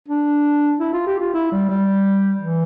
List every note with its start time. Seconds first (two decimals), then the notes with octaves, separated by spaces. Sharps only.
0.08 D4
0.79 E4
0.93 F4
1.06 G4
1.19 F4
1.34 E4
1.52 G3
1.69 G3
2.41 E3